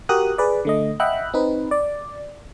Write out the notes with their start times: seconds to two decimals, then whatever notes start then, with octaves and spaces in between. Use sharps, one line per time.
0.09 F#4 G4 A#4 D#6 F#6
0.38 G#4 B4 D5
0.65 D3 A3 D#5
1.00 D#5 E5 F#5 G5 B5 F#6
1.34 C4 D#4 B4
1.71 D5